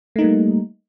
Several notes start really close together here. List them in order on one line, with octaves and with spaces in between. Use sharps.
A3 D#4 A#3 G3